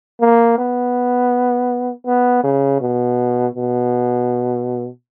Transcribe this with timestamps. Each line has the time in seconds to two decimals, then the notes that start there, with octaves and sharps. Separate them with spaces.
0.21 A#3
0.58 B3
2.07 B3
2.44 C#3
2.81 B2
3.55 B2